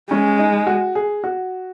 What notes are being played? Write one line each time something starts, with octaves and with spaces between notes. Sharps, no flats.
G#3 C#4
D#4
F#4
G#4
F#4